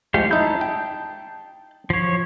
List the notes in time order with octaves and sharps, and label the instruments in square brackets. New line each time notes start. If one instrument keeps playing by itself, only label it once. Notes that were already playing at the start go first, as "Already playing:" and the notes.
[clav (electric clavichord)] F3 G#3 [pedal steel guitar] A3 G4 F5
[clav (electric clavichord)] D#4 E4 [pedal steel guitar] A5 G6
[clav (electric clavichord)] G5
[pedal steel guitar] F3 C#5